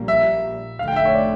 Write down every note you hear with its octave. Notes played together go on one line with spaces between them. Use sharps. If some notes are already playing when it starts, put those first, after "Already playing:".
Already playing: A#1 A#2 G3 A#3
E5
F1 F2 D3 A3 F5
G5
E5
C#5
D5